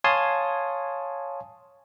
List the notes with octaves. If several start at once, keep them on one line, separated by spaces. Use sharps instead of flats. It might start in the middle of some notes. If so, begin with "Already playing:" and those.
C#5 F5 G#5 A5 C6 D#6